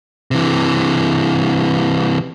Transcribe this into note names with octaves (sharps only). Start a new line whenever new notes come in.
C3 E3